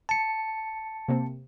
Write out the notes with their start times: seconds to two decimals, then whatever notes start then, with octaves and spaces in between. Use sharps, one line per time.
0.09 A5 C#7
1.08 C3 A#3 C4